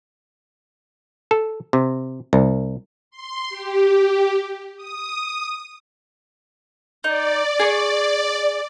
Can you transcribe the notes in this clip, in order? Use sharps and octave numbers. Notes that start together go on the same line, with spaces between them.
A4
C3
C2
C6
G4
D#6
D#4 D5
G#4 C#6